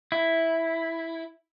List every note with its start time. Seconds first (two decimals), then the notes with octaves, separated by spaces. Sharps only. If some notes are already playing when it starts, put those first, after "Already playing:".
0.12 E4